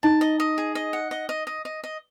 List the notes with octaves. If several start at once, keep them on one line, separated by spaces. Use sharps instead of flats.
D#4 A5
D#5
D#5
G#4
D#5
F#5
D#5
D#5
D#5
D#5
D#5